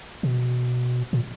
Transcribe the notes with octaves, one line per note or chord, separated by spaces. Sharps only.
B2
A#2